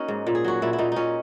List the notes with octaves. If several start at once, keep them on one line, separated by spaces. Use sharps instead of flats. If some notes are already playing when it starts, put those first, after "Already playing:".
Already playing: A#3 C#4 D#4 F#4
G#2
A#2
G#4
F#3 F#4
A#2 E4
E4
A#2 D#4
A#2 C#4 D#4